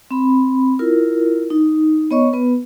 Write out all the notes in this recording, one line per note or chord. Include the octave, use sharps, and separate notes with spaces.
C4 B5
E4 F4 A#4
D#4
B3 C#5 D#5 C#6
B3 B4